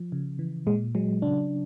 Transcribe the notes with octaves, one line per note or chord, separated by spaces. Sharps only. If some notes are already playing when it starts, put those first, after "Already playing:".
Already playing: F3
C#3
E3
A#2 G#3
F#3 G#3
C#3 D4